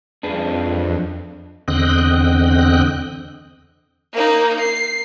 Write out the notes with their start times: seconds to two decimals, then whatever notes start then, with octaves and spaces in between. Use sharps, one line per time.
0.23 F2 D4 G#4 B4
1.68 E2 D3 C4 D#5 G5 F#6
4.13 A#3 D#4
4.61 C7